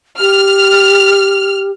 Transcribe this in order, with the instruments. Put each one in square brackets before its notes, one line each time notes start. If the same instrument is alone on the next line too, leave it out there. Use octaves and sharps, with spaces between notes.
[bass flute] G4 [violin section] F6